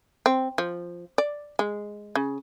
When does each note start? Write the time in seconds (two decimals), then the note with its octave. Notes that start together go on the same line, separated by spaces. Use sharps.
0.26 C4
0.58 F3
1.18 D5
1.59 G#3
2.16 C#3